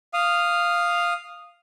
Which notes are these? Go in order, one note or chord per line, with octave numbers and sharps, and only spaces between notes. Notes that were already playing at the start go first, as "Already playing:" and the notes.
F5 D#6